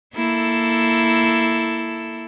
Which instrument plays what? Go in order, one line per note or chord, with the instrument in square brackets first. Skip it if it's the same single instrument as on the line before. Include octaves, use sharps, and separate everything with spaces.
[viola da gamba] A#3 E4 A4